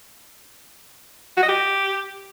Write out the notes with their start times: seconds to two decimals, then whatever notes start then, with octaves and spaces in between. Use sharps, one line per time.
1.37 F#4
1.43 D#5
1.48 G4